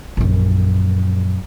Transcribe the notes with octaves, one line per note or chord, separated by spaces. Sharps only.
A#1 F#2